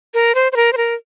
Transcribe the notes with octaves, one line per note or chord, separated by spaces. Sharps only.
A#4
C5
C5
A#4
C5
A#4